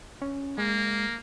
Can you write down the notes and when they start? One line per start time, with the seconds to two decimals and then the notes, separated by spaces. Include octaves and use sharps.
0.22 C#4
0.58 G#3 A#3